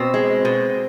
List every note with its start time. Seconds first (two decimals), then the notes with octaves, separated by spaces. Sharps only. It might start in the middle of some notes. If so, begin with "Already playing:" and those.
Already playing: B2 C4
0.14 G#3
0.45 B2